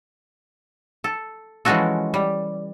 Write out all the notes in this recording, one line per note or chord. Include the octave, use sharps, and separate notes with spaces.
A4
E3 F3 G#3 C#4 F#4 A4
G3